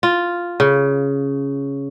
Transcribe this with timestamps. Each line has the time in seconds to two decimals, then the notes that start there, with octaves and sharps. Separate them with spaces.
0.03 F4
0.60 C#3